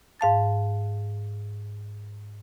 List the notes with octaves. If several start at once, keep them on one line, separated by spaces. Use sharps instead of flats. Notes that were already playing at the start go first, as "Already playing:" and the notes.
G#2 F5 A5 A6